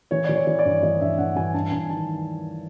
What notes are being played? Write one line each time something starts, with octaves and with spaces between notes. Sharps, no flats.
E3 C#5
E3 D5
C#5
E3
D5
G2
E3 D#5
G2 E5
G2 F#5
E3 G#5
G2 A5
G2 G#5
D#3 A5